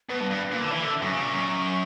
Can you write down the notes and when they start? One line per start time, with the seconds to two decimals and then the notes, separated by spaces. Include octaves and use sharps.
0.09 B2 B4
0.20 G2
0.30 G2
0.51 A#2
0.61 D3
0.71 E3 E5
0.82 D3
1.02 F#2 C#6
1.13 C#3
1.23 A#2
1.33 F#2